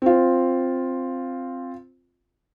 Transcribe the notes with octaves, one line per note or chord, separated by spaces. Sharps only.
C4 F4